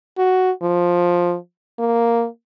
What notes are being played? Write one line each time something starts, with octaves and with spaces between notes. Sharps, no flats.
F#4
F3
A#3